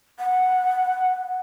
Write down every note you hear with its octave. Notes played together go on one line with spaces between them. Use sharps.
F#5